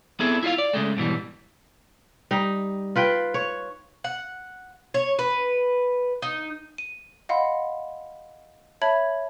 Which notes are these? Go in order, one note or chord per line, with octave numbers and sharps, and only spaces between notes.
B3 C4 E4 G#4 A4
E4 F4 D#5 F5
D5
C#3 G#3 A3
G#2 B2 E3 G3
G3 D#4
F4 B4 G5
C#5
F#5
C#5
B4
D#4
D#7
D#5 F5 F#5 B5 C6
C#5 E5 A5 B5 G#6 F#7